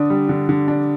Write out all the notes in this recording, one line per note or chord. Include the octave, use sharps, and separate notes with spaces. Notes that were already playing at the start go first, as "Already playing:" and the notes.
Already playing: D3 D4 D#6
G3
D3
D3
D4